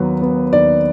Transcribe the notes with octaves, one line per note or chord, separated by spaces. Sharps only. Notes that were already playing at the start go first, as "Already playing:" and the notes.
Already playing: D#2 F#3 B3 B4
B3
D#2 D5